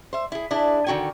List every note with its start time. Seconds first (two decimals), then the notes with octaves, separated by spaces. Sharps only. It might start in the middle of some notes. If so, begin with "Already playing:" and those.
0.13 C5 E5
0.32 E4 G#4
0.51 D4 E4 G#4
0.87 D3 D#3 F#4 G5 G#5